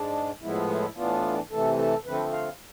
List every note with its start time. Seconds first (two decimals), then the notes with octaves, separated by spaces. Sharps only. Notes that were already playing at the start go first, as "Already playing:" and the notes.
Already playing: G#2 G#3 D4
0.42 A2 F3 G#3 B3 E4
0.70 E4
0.96 A2 E3 B3 D4 F4
1.51 C3 E3 A3 A4
1.78 A4
2.05 D3 F3 A3 C4 B4
2.32 F5